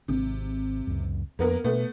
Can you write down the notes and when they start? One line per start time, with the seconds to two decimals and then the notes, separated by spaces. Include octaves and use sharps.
0.08 G#1 C3
0.87 C#2 F#2
1.39 F2 A#3 B3 A#4
1.64 B2 A3 B3